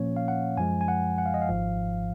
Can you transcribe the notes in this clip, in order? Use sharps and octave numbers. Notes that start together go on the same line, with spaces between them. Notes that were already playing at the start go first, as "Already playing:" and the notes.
Already playing: A#2 F3 A#3 C#4 C#5
F5
F#5
F#2 F3 G#3 G#5
G#5
F#5
F#5
F5
D#5
F5
G#1 G#2 F3